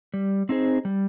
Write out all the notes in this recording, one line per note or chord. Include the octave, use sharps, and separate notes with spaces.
G3
C4 D#4 G#4 C5
G3